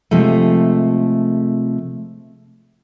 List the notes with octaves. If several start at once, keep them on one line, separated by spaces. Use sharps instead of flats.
C3 F3 G#3 A3